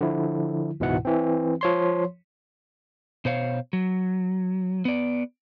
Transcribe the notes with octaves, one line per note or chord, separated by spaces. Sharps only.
D3 F3 E4
C#2 G#2 B2 E3 E4 F#5
E3 C4
F3 C#5 C6
B2 C5 C#5 F5
F#3
B3 D5